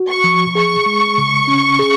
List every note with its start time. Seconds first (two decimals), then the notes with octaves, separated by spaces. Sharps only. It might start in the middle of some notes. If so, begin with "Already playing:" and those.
Already playing: F#4
0.09 C#6
0.24 F3
0.55 G#4 C#6
0.86 G#3
1.18 C#3
1.48 C#4
1.79 G#4